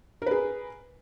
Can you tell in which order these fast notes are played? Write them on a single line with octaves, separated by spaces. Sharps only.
A#4 B4 G#4